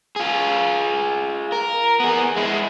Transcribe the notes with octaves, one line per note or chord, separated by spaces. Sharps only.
F4 G#4
A#4
B3 G#4
G#3 E4